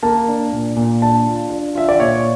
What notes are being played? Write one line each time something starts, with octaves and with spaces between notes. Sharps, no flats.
A#3 A5
D4
A#2
A#2
D4 A5
F4
D4
F4 E5
D5
A#2 C#5